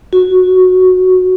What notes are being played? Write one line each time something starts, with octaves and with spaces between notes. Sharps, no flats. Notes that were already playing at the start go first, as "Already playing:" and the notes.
F#4